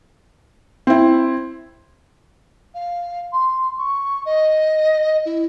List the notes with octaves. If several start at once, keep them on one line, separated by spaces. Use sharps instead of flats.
C4 E4
F5
C6
C#6
D#5
E4